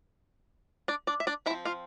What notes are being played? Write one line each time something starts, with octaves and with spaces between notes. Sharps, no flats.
D4 D5
D4 D5
E5
D4 D5
F3 C4 E4 E5
F4 F5